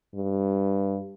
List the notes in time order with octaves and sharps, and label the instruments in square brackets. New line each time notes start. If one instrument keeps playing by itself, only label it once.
[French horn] G2